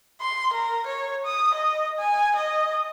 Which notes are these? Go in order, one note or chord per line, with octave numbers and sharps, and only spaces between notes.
C6
A#4
C#5
D#6
D#5
G#5
D#5